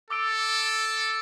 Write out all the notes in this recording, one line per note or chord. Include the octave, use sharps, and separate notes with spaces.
A4 D6 E6 D7